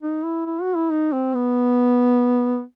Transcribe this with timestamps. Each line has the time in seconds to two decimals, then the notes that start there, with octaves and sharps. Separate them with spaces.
0.02 D#4
0.24 E4
0.46 E4
0.61 F#4
0.76 E4
0.90 D#4
1.12 C4
1.34 B3